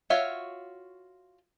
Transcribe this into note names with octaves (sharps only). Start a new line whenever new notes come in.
F4 F#4 C#5 E5 F5